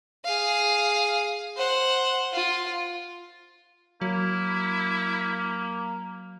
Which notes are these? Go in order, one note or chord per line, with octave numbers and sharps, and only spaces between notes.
G#4 F5
C5 F#5
F4
F#3 A#3 E4